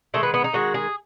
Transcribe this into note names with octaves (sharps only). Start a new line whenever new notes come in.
D#3 G#3 A3
B3
B3
D#4
D#3 G#3 F#4
G#4